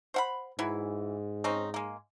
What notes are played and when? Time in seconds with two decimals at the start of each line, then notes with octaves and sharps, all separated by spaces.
0.14 C5 F#5 B5
0.59 G#2 E3 F#3 E4
1.44 C4 C#4 D#4
1.74 G#3 A#3